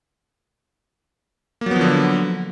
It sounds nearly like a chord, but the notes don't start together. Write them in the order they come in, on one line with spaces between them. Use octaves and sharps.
A#3 F#3 B3 F3 D3